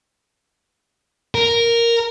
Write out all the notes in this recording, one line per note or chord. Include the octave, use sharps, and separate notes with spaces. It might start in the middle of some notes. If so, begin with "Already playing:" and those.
A#4